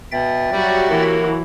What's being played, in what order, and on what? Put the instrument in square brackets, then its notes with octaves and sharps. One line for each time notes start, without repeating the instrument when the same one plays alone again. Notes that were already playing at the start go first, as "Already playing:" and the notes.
[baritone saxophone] B2 [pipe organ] E5 G5 A6
[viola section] F#3 F#4 G4 [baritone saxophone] G3
[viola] E3 [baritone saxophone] A#3